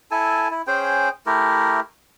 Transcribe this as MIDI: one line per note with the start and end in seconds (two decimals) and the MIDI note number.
0.11 0.48 64
0.11 0.48 69
0.11 0.48 80
0.11 0.48 81
0.51 0.62 64
0.67 1.09 61
0.67 1.09 68
0.67 1.09 72
0.67 1.09 79
1.26 1.80 57
1.26 1.80 64
1.26 1.80 67
1.26 1.80 70